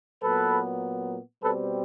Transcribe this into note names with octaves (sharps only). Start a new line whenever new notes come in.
A#2 F#3 B3 A4 B4
B2 G3 C4 A4 B4